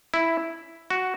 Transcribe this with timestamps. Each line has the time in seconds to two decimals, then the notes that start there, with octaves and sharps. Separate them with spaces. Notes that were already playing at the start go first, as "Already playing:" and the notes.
0.14 E4
0.90 F#4